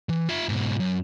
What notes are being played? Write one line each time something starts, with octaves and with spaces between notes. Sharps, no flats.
E3
F4 E5
G#2 B2
F#2